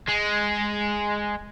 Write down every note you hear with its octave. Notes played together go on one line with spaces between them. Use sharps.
G#3